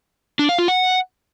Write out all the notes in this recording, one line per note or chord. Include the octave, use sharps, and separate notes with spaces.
D4
F5
F4
F#5